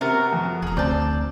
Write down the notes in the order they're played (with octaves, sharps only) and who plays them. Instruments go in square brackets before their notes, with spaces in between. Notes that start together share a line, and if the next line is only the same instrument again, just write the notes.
[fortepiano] C3 [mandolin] B3 F#4 A#4
[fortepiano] F2
[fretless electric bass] F1 [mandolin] G#4 A#5
[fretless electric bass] D2 [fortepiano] C4 D5 [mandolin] A5 G6